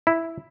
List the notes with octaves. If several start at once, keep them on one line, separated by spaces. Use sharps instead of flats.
E4